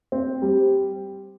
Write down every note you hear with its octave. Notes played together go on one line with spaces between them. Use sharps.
C4
G3